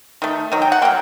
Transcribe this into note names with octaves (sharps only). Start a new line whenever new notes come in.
D#3 A3
D#3 F#3
G5
F#5
F#3 A#3 G5